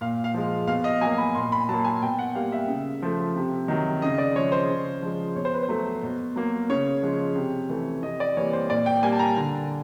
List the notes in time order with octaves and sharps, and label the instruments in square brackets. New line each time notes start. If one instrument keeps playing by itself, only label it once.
[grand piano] A#2 F5
F5
F3 G#3
B2 F5
D#5
F#3 A#3 G#5
B5
A#2 C6
B5
F#3 A#3 A5
G#5
B2 G5
F#5
G3 A#3 F5
E5
C#3
F3 A3
C3
D#3 F#3
C#3 D#5
D5
F3 G#3 C#5
C5
C#3
F3 G#3
B2 C#5
C5
B4
C5
F#3 A3
B2
F#3 A#3
C#3 C#5
F3 G#3
C3
E3 A3
C3 D#5
D5
E3 G3 A#3 C#5
C5
A#2 D5
G5
G3 A#3 G#5
A5
A#5
D3